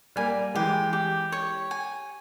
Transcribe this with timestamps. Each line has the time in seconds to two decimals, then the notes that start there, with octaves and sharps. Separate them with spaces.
0.16 G3 A#3 G#5
0.55 E3 G#3 G4
0.93 G4
1.32 C#5
1.71 G#5